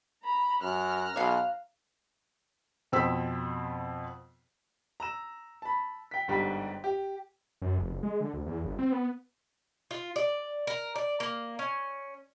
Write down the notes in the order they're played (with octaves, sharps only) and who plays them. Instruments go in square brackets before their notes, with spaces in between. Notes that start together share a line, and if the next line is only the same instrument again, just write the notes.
[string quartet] A#5 B5
[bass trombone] F#2 [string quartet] A#5 F6 F#6
[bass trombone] B1 [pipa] C#5 F5
[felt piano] F2 B2 C4 G5 E6 B6
[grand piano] A#5 E6 E7
A5 B5
G5 B6
G1 G#2 G3 G4 B6
G4
[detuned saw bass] F#2
F1
F#1
G#3
D3
D2
E2
G1
C4
B3
[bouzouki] F4
D5
A#4
D5
A#3
C#4